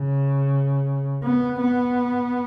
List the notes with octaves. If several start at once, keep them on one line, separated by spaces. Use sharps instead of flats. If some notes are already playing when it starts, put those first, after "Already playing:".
Already playing: C#3
B3
B3